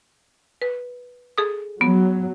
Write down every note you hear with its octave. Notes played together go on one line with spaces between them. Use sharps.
B4
G#4 A4 D#6
F#3 B3